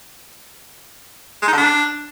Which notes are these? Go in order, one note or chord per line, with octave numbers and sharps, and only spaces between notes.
G#3
D#4
D3
D4